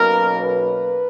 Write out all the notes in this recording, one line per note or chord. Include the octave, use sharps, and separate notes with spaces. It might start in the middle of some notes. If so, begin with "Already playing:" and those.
Already playing: B1 B2 A#3 C#4 A#4
B4